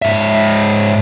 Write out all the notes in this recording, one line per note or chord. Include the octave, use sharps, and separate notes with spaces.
G#2 E5